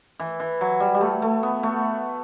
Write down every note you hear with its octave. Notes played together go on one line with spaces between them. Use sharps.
E3
E3
F#3
G3
G3
A3
A3
B3
A3